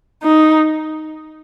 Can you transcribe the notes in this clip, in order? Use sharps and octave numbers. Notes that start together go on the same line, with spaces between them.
D#4